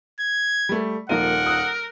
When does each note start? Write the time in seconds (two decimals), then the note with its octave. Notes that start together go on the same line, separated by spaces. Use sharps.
0.20 G#6
0.69 G3 A3
1.09 D#1 F3 A#3 D#4 F4 A#4 F#5 D#7
1.46 D#6 E6 F#6